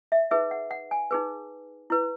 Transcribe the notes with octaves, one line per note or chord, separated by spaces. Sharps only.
E5
D#4 G#4 B4 E5
F#5
F#5
G#5
D#4 G#4 B4
E4 B4